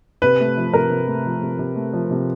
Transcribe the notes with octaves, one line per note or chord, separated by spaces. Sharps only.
C3 B4
A3
F3
C3 A#4
C3
A3
F3
C3
C3
A3
F3
C3